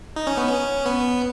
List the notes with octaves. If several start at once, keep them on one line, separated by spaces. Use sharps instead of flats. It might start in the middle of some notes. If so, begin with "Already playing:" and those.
D#4
C#4
B3
C#4
B3